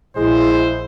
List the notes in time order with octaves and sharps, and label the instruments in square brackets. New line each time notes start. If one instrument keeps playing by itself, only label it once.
[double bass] A#1 [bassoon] G#3 [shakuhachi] E4 [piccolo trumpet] C5